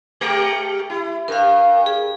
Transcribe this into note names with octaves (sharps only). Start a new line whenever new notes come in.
G#3 G4 A#4
E4
G2 A#4 F5
G#4